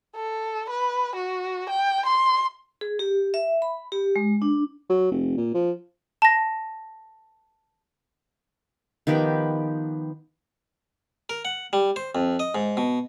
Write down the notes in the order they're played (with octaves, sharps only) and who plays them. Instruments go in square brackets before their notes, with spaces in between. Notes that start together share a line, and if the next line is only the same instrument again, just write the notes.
[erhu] A4
B4
F#4
G5
C6
[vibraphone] G#4
G4
E5
B5
G4
G#3
D4
[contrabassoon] F#3
F1
A#2
F3
[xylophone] A5 A#6
[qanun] D#3 F3 B3 G4
[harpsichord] A#4
F#5
G3
C5
F2
D#5
G#2
B2